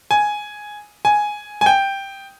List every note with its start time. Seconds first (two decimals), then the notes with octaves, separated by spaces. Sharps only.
0.11 G#5
1.05 G#5
1.61 G#5
1.66 G5